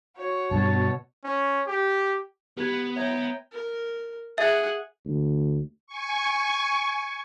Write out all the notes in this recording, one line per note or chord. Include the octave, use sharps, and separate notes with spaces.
F#4 C#5
G2 B2 A5
C#4
G4
B3 G4 B4 G#6
C#5 E5 G5 A#5 G#6
A#4
G#4 E5 F#5
D2
G#5 C#6